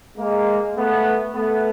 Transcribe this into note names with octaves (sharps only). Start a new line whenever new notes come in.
G#3 A#3
A3 B3
A3 B3